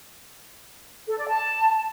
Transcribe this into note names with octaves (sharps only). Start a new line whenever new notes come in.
A4
D5
A5